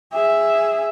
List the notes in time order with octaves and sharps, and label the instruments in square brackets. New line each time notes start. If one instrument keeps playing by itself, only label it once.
[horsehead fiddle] G#4 E5